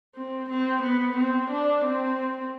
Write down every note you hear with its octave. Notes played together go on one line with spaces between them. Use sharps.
C4
C4
B3
C4
D4
C4